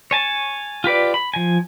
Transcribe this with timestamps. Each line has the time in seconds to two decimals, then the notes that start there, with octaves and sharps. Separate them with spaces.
0.11 C#5 G#5 A5
0.84 F4 G4 B4 D5
1.14 B5
1.34 F3 G#5